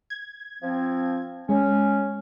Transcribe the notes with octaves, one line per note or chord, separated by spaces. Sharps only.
G#6
F3 C4
G#3 C#4